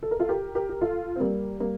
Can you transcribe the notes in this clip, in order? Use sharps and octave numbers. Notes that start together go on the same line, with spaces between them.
A4
A#4
F4 A4
G4 A#4
G4 A#4
G4
F4 A4
C4
G3 A#3
G3 A#3